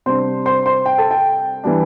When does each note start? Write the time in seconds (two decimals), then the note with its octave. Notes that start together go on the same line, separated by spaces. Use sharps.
0.06 C3 G3 D4 C5 C6
0.46 C5 C6
0.66 C5 C6
0.86 G5
0.98 A4 A5
1.11 G5
1.64 E3 G3 D4